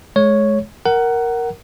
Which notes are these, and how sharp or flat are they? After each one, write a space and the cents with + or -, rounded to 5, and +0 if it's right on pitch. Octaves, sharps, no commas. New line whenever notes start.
G#3 +30 C#5 +0
A#4 +0 F#5 +20